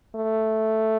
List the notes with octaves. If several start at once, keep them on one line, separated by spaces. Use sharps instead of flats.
A3